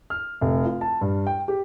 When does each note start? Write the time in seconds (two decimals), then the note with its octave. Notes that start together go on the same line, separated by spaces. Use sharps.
0.10 F6
0.41 F1
0.65 F4
0.81 A5
1.01 G2
1.27 G5
1.48 G4